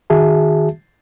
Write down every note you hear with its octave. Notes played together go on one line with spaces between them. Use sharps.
D#3 F#4 G#4 E5 A5